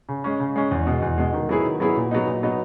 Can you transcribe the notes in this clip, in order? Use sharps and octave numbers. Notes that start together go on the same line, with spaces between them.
C#3
G#3 C#4
C#3
G#3 C#4
E2
B2 G#3
E2
B2 G#3
D#3
F#3 B3 E4 G#4
D#3
F#3 B3 E4 G#4
A#2
F#3 B3 D#4
A#2
F#3 B3 D#4